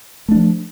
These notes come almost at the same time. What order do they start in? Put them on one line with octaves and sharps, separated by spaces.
A3 D4 F3